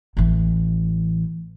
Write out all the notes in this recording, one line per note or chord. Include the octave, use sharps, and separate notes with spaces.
A1 E3